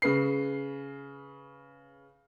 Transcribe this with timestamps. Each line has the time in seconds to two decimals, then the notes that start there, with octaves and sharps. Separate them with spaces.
0.02 C#3 B4 C7